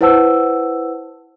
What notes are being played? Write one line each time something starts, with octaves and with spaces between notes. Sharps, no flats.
E4 B4 C5 F#5 A5 E6